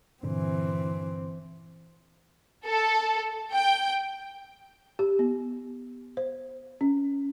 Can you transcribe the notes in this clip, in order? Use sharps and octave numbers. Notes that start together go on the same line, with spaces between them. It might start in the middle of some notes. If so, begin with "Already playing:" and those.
G2 A#2 D3 E3 C4
A4
G5
G4
B3
C5
C#4